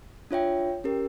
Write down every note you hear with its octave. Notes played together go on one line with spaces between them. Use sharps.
D4 F4 C#5 E5 G5
C#4 G4 A#4